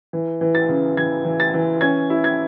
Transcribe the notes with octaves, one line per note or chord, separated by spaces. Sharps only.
E3
E3
A6
C#3
E3 G#6
E3
A6
E3
C#4 G#6
E4
G#6